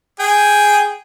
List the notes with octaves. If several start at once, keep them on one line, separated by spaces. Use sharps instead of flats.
G#4 G5